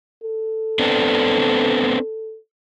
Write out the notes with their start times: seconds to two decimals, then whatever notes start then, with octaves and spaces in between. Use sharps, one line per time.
0.23 A4
0.79 B3 C4 D4